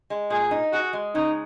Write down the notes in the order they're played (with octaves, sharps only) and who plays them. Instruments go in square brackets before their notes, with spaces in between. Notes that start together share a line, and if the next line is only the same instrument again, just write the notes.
[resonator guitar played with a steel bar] G#3
[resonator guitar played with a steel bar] A#2 [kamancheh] G#4
[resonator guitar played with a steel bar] D#4
[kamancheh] F#4 [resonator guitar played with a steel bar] G#4
[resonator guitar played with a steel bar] G#3
[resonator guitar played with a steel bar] C#3 [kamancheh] D#4